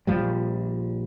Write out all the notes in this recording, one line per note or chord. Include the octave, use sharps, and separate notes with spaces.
A#1 F3 G3